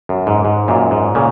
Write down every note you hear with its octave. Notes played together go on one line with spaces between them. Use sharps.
F#2
G#2
G#2
F#2 A#2
G#2
A#2 C#3